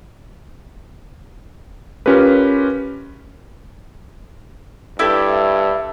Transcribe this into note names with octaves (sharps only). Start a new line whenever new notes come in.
C#4 F4 G4 A#4 B4
G2 E4 G4 A4